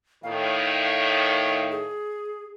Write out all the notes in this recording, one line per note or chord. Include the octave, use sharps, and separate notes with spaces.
A2 D#3 F5
G#4